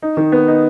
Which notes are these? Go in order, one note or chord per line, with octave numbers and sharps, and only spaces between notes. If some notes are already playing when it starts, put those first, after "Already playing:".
D#4
D#3
B3
D#4